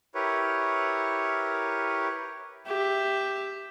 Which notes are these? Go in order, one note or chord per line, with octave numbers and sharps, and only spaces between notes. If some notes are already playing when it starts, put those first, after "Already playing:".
E4 G4 A#4 B4 C#5
G4 E5